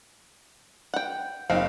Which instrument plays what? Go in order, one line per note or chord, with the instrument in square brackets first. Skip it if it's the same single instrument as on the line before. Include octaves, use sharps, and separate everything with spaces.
[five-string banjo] F#5 G5
[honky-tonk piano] F#1 D#4 F5 [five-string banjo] C4